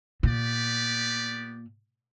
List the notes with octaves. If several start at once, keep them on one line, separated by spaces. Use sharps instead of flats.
A#2 B3 G4 D5